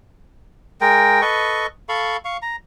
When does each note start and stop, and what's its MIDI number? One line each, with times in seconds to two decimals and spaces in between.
0.81 1.21 56
0.81 1.21 70
0.81 1.21 79
1.22 1.66 69
1.22 1.66 71
1.22 1.66 75
1.22 1.66 85
1.89 2.17 69
1.89 2.17 77
1.89 2.17 83
1.89 2.17 85
2.25 2.37 77
2.25 2.37 85
2.42 2.56 82